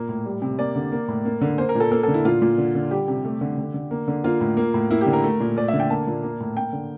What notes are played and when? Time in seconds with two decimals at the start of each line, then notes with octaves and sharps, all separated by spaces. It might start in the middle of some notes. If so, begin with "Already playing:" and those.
Already playing: A#2 A#3
0.09 A2
0.26 G3
0.42 C3
0.58 A#3 D5
0.76 D3
0.92 A#3
1.08 A2
1.25 A#3
1.41 D3
1.58 A#3 C5
1.69 A#4
1.75 A#2
1.80 A4
1.91 A#3 A4
2.03 A4
2.08 D3
2.14 E4
2.25 A#2 F4
2.42 A#2
2.58 D3
2.75 D3
2.91 G3 G4
3.08 C3
3.25 A3
3.41 D3
3.58 D3
3.74 D3
3.91 A#3
4.08 D3
4.24 A#3 F4
4.41 A2
4.57 A#3
4.74 A2
4.90 A#3 E4
5.01 G4
5.07 D3
5.13 A#4
5.24 A3
5.40 A#2
5.57 A3 D5
5.68 E5
5.73 D3
5.80 G5
5.90 A#3 A5
6.07 A#2
6.23 A#3
6.40 A2
6.56 A#3 G5
6.73 D3